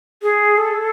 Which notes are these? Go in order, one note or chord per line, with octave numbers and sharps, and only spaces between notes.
G#4
A4